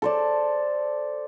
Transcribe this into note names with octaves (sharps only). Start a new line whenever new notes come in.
A4 C5 D5